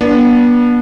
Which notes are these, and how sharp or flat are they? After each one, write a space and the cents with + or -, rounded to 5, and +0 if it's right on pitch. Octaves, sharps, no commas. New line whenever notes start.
B3 -35 D4 -10